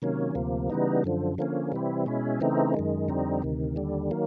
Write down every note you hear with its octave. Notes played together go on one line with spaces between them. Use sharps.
C3 D#3 F#3 A#3 C#4
D2 C3 F3 A#3
C#3 E3 G3 B3 D#4
F#2 D3 F3
D3 F3 A#3 C#4
C3 E3 G3 C4 E4
B2 G#3 C#4 E4
C#3 E3 A3 C4 D#4
F#2 D#3 G#3
F2 D3 G3 C4 D#4
D2 C3 D#3
D#2 D3 G3
D#3 F#3 A#3